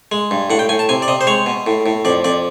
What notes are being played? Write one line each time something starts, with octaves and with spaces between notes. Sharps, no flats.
G#3
G2
A2 F#5
G5
A2 G#5
A5
C3 G#5
D5
C3 D#5
C5
G#3 C#5
B2
A2
A2
F2 D5
F2 D5